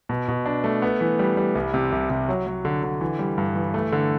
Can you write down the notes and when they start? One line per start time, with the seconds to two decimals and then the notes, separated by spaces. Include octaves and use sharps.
0.09 B2
0.28 B2
0.46 D4
0.64 A3
0.82 B3
1.01 E3
1.19 G3
1.37 G3
1.55 C2
1.74 C3
1.92 C2
2.10 C3
2.29 F#3
2.47 F#3
2.65 D3
2.83 D3
3.01 E3
3.19 G3
3.38 G2
3.56 E3
3.74 A3
3.92 D3